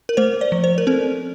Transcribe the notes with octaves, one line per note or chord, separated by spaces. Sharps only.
A#4
A3 C5
D5
F3
C5
A#4
C4 A4